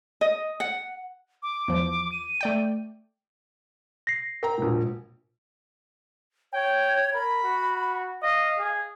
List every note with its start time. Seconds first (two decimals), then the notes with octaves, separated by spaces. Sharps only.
0.21 D#5
0.60 F#5
1.43 D6
1.68 E2 F3
2.12 D#7
2.41 A3 D5 G5
4.07 A#6 C7
4.43 A#4 G5 A#5
4.58 E1 A#1
6.53 C#5 G5
7.14 A#4 B5
7.43 F#4
8.22 D#5 F5
8.59 G#4